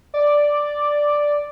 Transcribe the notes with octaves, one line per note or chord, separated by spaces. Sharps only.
D5